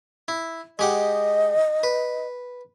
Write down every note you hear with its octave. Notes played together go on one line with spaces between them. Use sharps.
E4
G#3 G4 D#5 F#5
B4